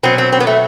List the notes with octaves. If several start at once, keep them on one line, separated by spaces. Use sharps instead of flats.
B2 F#3 C4
C4
C4
B3
A3